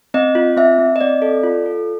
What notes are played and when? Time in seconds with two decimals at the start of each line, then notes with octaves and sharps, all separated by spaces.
0.14 C4 D#5
0.35 F4
0.57 C4 E5
0.78 C4
0.96 D#5
1.01 C4 D5
1.22 A4
1.43 F4
1.66 A4